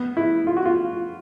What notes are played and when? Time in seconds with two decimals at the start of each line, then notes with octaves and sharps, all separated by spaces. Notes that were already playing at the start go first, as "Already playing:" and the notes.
Already playing: B3
0.17 E4
0.47 F4
0.57 F#4
0.65 F4